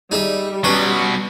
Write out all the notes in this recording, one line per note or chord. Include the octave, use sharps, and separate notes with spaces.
G3 D#4 G#4 E5
B2 F#3 C#4 B4